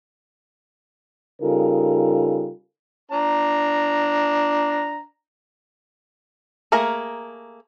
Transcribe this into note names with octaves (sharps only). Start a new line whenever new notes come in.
C#3 G3 D#4 F4 A4 A#4
D4 A#5
A3 A#3 G#4 A#4 A#5